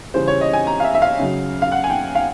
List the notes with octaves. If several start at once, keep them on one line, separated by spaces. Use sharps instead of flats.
C#3 E3 G3 C5
C#5
D#5
G#5
A#5
F5
E5
E5
F5
C#3 F#3
F5
F#5
G#5
G5
F5